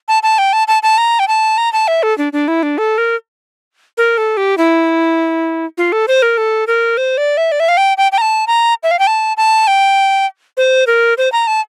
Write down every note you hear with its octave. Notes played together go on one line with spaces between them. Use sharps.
A5
A5
G5
A5
A5
A5
A#5
G5
A5
A#5
A5
E5
A4
D4
D4
E4
D4
A4
A#4
A#4
A4
G4
E4
F4
A4
C5
A#4
A4
A#4
C5
D5
E5
D5
E5
F5
G5
G5
G5
A#5
A5
A#5
E5
F5
G5
A5
A5
G5
C5
A#4
C5
A#5
A5